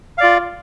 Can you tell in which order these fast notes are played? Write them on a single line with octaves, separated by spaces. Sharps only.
F5 D5 F4